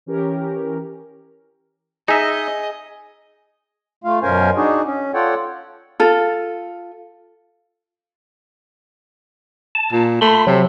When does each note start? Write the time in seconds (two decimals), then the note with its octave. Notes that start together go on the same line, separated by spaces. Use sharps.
0.06 E3 C#4 G4 A#4
2.08 D#4 G#4 D#5 E5
4.04 A3 F4 F5
4.23 F#2 B2 C#4 A#4 C5 G#5
4.56 D4 D#4 F#4 G#4
4.85 C#4
5.14 F4 A4 C#5 D5 F#5 G5
6.00 F4 A4
9.75 A5
9.92 A#2
10.21 A3 B5 C6
10.47 C3 F#3